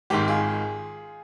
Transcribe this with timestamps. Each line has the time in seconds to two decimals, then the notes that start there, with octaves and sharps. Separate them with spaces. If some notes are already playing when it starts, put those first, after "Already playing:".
0.10 G#1 G#2 D#3 G4
0.28 F4 G#4